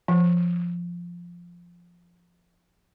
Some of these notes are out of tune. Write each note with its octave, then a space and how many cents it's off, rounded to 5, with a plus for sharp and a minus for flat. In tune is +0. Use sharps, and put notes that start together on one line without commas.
F3 -5